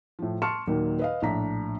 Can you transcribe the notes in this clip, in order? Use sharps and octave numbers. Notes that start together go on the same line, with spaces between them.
A2 F3
A5 C6 C#6 F6 C#7 E7
D#2 A#2 D#3 F#3
B4 D#5 F5
A#1 A2 D4 A#5 B6